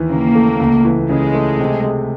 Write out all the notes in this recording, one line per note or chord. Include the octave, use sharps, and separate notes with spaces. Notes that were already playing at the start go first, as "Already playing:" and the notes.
Already playing: D#2 E3
C#3 A#3
A3
C#2
E3
C#3 G#3
A3
C3
G#3